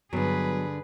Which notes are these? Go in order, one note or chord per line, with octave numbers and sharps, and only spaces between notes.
G2 D3 F#3 B3 G#4 B4